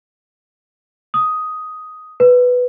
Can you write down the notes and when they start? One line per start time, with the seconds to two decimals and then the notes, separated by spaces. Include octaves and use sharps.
1.14 D#6
2.20 B4